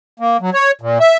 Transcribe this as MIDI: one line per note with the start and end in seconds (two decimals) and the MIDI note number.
0.20 0.37 58
0.41 0.50 54
0.54 0.71 73
0.81 0.98 46
1.00 1.17 76